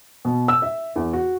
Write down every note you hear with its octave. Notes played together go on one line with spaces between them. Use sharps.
B2
E6
E5
E2
F#4